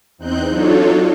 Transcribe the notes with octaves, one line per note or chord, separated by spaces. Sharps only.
E2 C4 D#4 F#6 G6
F#3 D4 D#4 F4 A4 C#5